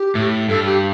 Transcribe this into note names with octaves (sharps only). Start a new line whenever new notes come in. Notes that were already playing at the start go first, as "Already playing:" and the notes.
Already playing: G4
A2
G2 A4
G4